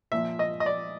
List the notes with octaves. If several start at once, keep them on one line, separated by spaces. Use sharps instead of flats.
A#2 F3 E5
D#5
D#5
D5